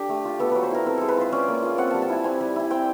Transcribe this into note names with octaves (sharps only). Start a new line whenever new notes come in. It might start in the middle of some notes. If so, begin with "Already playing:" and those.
Already playing: D4 G4 A4
A3
F4
B3 A4
F#3 B4
C5
E4 A#4
C4 A4
G#3 A4
B4
F4 C5
C#4 D5
A#3
F4
C4 F#5
G3 A5
A5
E4 G#5
C4 G#5
G3
E4 G#5
C4 G5